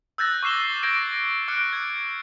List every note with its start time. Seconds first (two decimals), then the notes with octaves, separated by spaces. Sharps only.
0.18 E6 F#6 G6 A6 A#6
0.43 C#6 D6 C7 E7 G7
0.83 D6 G6 G#6 A#6 D7
1.48 D6 F6 F#6 C#7 D7
1.73 G#6